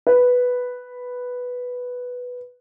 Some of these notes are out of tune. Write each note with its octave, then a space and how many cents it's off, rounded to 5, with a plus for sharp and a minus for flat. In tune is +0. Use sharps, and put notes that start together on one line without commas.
B4 +0